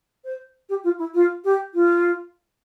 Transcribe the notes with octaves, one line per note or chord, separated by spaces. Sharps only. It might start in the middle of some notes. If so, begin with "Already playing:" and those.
C5
G4
F4
E4
F4
G4
F4